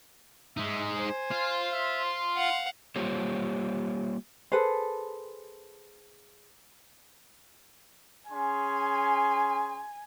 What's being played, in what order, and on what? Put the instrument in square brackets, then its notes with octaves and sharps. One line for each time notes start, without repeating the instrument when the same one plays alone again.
[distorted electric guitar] G#3 D#4 [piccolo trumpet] E5
[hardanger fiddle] C5 [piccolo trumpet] G#5
[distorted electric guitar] F4
[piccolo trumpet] E5
C6
[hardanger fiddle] F5 F#5
[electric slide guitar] G3 A#3 F4 G4 C5 C#5
[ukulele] G#4 A4 B4 C5
[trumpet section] C#4 G#4 C6 [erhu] G#5